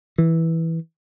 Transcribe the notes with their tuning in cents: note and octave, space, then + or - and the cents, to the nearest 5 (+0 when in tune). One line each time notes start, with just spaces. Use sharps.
E3 -10